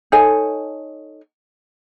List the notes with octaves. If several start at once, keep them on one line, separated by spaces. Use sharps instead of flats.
D#4 A4 C#5 G#5